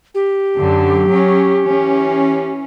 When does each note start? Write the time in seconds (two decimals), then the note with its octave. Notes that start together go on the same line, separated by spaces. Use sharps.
0.15 G4
0.56 F#2 D3
1.09 F#3 C#4
1.62 E3 C#4